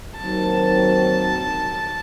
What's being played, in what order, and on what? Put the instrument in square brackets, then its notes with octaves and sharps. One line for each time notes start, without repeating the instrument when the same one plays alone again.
[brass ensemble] D#2 D#3 F#3 C4 [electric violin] A5